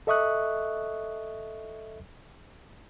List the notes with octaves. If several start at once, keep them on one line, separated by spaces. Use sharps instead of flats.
A4 D#5 E5 C#6 D#6 F#6